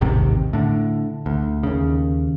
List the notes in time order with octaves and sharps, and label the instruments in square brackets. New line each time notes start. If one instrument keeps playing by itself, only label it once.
[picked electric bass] A1 D#2 G#2 C3
A2 D3
D2
D#2 C#3